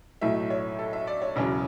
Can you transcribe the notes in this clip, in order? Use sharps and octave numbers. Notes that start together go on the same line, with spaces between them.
B1 A2 F#3 A3 E5
C#5
A4
E5
D5
C#5
E1 E2 C#3 F#3